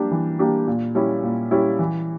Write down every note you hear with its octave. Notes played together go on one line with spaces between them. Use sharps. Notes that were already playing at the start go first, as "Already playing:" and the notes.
Already playing: G3 A#3 D4 G4
E3
G3 A#3 D4 G4
A#2
G3 C#4 E4
A#2
G3 C#4 E4
E3